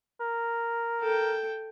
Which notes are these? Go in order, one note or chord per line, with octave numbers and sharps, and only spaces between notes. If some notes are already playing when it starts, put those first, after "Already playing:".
A#4
A4 G5